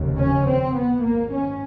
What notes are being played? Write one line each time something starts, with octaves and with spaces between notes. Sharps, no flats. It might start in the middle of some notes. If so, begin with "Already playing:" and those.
Already playing: F1 D#2 C#3
C#4
C4
B3
G#1 G#2 A#3
C#4